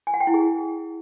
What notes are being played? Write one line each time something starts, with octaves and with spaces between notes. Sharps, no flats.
G#5
F#5
G5
E4
G#4